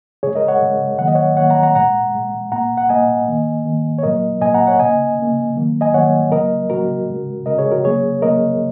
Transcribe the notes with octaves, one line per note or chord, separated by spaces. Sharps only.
C#3 G#3 G#4 C#5
A#4 D#5
C#5 F#5
C#3 G#3
D#3 F#3 A#3 F#5
D#5
C#5 F#5
D#3 F#3 A#3 C#5 F#5
F#5 A#5
F#5 A#5
A#2 G#3 F#5 A#5
A#2 G#3
A#2 A#3 F#5 A#5
F#5
A#2 A#3 D#5 G#5
D#3 A#3
D#3 A#3
C#5
A#2 F#3 A#3 A#4 D#5
A#2 F#3 A#3 D#5 G#5
F#5 A#5
C#5 F#5
C#3 A#3 D#5 G#5
C#3 A#3
D#3 F#3 A#3
D#5 G#5
D#3 F#3 A#3 C#5 F#5
C#3 F#3 A#3 A#4 D#5
C#3 F#3 A#3 F#4 A#4
C#3 G#3
C#3 G#3 A#4 D#5
G#4 C#5
F#4 A#4
C#3 F#3 A#3 G#4 C#5
C#3 F#3 A#3 A#4 D#5